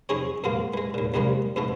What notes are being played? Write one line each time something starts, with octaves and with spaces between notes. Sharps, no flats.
F2 D#4 G#4 C#5
F2 B2 G#3 A#3 F4
E3 G#3
D#2 A#2
C2 F2 G#2 G3 G#3 A#3
F2 G#2 B2 A3